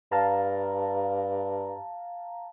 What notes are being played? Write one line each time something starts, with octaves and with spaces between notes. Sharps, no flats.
G2 F5 A5 A#5